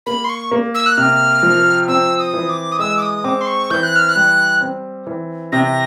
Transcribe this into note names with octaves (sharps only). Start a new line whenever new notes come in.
A#3 B5
C6
C#6
A#3
E6
F#6
C3 F6
F3
C4 E6
D#6
E3
D6
D#6
G#3 E6
D6
D#6
C4 D6
C6
C#6
E3 G6
F#6
F6
F#6
G3
C4
E3
C3 A#6